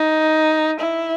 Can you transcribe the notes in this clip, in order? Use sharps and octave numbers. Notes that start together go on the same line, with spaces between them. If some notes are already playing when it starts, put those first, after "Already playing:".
Already playing: D#4
E4